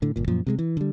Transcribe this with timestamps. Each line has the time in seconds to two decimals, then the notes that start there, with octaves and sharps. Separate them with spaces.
0.02 A2 D3
0.16 G1 A#2
0.28 F#2 A#2 F3
0.47 C3 G3 G#3
0.59 E3
0.77 D3 G3